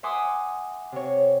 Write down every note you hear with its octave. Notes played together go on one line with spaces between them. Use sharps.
E5 F#5 G#5 C6 D6 D#6
C3 C#5